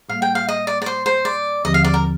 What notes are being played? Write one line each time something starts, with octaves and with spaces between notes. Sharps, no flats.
A2 G3 A#3 F5
G5
F5
D#5
D5
D5
C5
C5
D5
D#2 D3 F3 C4 G4 D#5
F5
D5
A#4